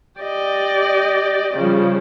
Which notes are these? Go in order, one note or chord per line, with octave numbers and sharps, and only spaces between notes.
G4 D5 D#5
C#3 F3 G3